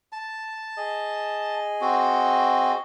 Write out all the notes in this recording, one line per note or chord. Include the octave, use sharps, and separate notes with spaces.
A5
G#4 D#5
C4 F#4